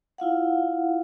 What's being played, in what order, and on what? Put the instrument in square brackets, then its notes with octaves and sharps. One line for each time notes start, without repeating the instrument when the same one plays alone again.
[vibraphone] E4 F4 F5 F#5